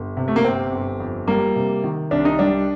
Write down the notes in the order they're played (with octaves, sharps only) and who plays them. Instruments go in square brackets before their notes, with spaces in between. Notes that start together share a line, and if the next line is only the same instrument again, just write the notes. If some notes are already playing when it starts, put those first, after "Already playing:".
Already playing: [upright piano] G1
C3
A3
A#3
G1 C4
G1
F2
G3 A#3
C3
D#3
C2 D4
D#4
G3 D4